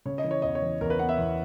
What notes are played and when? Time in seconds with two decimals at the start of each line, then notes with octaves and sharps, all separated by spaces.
0.06 C#3 C#5
0.18 D#5
0.24 E3
0.31 C#5
0.42 E2 D#5
0.55 C#5
0.62 E3
0.81 E2 A#4
0.90 B4
0.99 B3 F#5
1.09 E5
1.18 E2